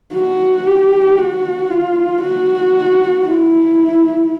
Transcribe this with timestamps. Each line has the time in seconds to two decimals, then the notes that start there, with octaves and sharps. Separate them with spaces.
0.14 F#4
0.66 G4
1.18 F#4
1.70 F4
2.22 F#4
3.26 E4